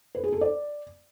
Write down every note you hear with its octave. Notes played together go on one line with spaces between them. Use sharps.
B4
G#4
A4
D5